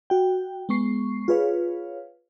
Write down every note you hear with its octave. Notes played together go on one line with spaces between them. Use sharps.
F#4 G5
G#3 B3 C#6 C7
F4 G#4 B4 C#5 F5